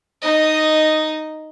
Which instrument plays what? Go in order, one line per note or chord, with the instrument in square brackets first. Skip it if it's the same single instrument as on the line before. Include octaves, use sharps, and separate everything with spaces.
[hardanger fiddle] D#4 D#5